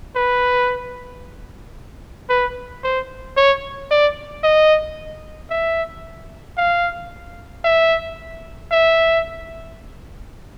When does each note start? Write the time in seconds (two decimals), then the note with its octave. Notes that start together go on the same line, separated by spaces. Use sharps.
0.16 B4
2.30 B4
2.84 C5
3.37 C#5
3.91 D5
4.43 D#5
5.50 E5
6.57 F5
7.64 E5
8.72 E5